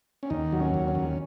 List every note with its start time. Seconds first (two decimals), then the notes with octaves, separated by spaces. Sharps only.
0.23 C#4
0.30 D#2 D#4
0.52 F#3
0.60 C#4
0.74 D#2
0.88 C#4
0.95 D#2